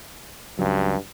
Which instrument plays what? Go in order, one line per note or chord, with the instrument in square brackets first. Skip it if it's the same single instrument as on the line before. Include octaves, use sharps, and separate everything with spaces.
[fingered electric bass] C#2 C#3 F#3 [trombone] G2